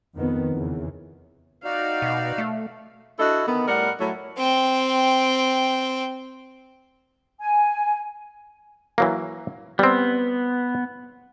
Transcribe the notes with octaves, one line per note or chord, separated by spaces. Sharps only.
F2 D#3 B3
E2 C#3
D#4 F#4 D5 F5
B2
A3
D4 E4 F#4 A4 D#5
D3 D#3 B3
A2 G3 A#4 F#5
A2 F#3
C4 G5
G#5
E3 F#3 A#3
G3 B3 C4